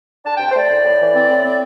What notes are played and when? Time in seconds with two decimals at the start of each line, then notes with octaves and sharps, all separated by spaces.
0.25 D4 A5
0.35 G5
0.40 C3
0.46 G5
0.51 C5
0.55 A3 D5
0.70 C2
0.84 A2
1.00 E3
1.14 C4
1.30 A2
1.44 C4